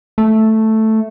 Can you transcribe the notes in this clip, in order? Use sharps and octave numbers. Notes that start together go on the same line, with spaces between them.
A3